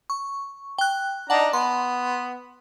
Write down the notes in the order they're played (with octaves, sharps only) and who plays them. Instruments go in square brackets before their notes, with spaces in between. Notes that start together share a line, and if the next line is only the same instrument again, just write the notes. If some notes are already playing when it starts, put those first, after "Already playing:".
[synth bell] C#6
G5 F#6
[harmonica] D4 D#4 A#5 [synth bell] F#5 A5
[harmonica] B3 [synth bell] C6